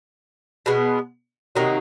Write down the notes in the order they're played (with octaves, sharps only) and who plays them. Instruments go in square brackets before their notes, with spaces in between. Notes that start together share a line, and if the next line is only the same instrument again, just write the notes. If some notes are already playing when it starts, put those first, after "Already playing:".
[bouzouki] B2 G#3 B3
C3 D#3 F#3 A#3